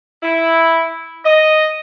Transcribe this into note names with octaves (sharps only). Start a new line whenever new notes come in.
E4
D#5